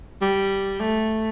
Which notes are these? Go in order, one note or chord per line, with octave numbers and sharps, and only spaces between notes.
G3
A3